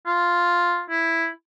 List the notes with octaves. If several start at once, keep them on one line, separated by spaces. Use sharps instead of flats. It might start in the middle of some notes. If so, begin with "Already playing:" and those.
F4
E4